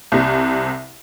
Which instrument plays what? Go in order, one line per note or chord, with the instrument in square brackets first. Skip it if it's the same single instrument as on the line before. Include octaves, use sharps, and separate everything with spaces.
[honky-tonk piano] C2 C3